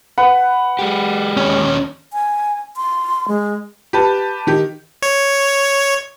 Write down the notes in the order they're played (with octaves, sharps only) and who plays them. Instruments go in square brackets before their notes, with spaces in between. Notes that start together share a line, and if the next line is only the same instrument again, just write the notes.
[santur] B4 [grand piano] F#5
[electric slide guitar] G#3 G4
[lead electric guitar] D#2 C#4
[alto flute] G#5
C6
G#3
[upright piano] G4 B4 A5
D#3 G4
[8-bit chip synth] C#5